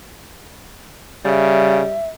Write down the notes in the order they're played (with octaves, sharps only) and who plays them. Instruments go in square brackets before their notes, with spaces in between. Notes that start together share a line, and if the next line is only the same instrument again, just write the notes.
[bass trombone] C#3 [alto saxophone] G3 [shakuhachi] E5